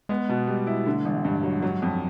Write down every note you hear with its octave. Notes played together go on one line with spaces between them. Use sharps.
G#3 B3
B2
G3
E4
D3 A3
A1 G#3
G2
F#3
F#3
F2